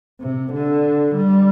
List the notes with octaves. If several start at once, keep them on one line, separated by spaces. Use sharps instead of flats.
C3
D3
G3